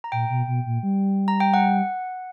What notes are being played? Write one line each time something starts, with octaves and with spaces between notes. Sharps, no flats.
A#5
A#2 G5
B2
B2
A#2
G3
A#5
G5
F#5